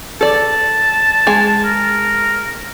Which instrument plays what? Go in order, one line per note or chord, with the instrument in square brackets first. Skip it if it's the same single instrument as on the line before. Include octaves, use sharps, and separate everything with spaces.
[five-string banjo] A4 D5 [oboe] A5
[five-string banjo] G#3 G#5
[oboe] A#4